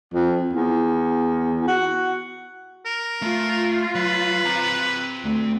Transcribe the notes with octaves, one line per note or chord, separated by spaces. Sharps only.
F2
E2
F#4
A#4
A3 F4
F#3 B4
C4 A#5
D2